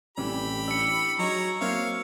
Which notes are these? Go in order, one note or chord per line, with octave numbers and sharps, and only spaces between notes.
A1 C3 E3 G3 G4 B5
D4 E6 C#7
F#3 D#4 G#4 C#5 A#5
F#3 A#3 C4 E4 C#5 F5